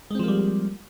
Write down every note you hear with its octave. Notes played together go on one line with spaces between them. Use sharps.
F3 G3 G#3 A#3 C4